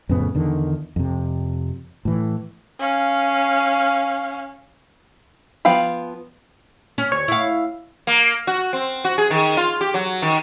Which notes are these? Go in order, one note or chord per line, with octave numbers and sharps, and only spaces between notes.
F2 A2 C#3 B3
E2 D3 D#3
F2 C3
A2 E3
C#4 F5
F3 B3 F5 G5 B5
C#4
D2 C#5
E4 F5
A#3
F#4
C4
F#4
G#4
D#3
F4
G4
F#3
D#3